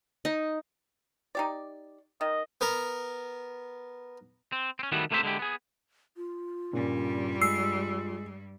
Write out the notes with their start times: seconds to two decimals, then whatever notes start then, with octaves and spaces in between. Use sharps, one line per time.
0.25 D#4
1.35 D#4 G4 D5
2.21 D#3 D#5
2.61 B3 A#4
4.52 C4
4.79 C4 C#4
4.92 D#3 G3 A3 B3 E4 F#4
5.11 C#2 A3 A#3 C4 C5 E5
5.23 D3 G#3 E4 G4
5.39 B3 G#4
6.17 F4
6.73 G2 A#2 C#3 G3
7.41 G#3 E6 C7